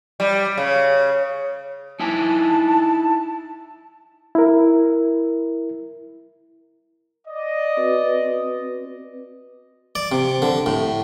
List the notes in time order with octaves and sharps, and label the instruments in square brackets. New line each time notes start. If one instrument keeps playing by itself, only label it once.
[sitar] G3
C#3
[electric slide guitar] D#4 E4 G#5 [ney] A5
[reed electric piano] E4 A#4
[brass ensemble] D5 D#5
[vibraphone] C4 F#4 B4
[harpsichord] D5
C3
D3
A2